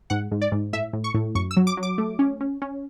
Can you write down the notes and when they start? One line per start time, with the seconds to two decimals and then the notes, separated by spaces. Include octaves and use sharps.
0.10 G#2 F#5
0.31 G#2
0.42 D5
0.52 G#2
0.73 A2 E5
0.93 A2
1.04 C#6
1.14 A2
1.35 F#2 C#6
1.51 E6
1.57 F#3
1.67 D6
1.77 F#3
1.83 D6
1.98 A3
2.19 C#4
2.41 C#4
2.62 C#4